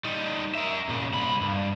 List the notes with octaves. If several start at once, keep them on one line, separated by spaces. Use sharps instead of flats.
G3 D#4
A#4 E5
A#2 C#3
C2 B5
G2